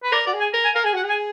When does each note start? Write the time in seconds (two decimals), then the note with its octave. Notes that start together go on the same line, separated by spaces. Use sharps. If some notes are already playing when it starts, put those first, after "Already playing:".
0.03 B4
0.12 A#4 D5
0.26 F#4 D5
0.34 G#4
0.40 G#5
0.54 A#4 A#5
0.65 G#5
0.75 A#4 F5
0.84 G#4 G#5
0.94 F#4 F#5
1.04 G#4
1.09 G#5